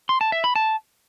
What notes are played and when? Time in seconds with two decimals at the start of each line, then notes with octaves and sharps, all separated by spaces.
0.09 C6
0.21 A5
0.32 E5
0.44 B5
0.56 A5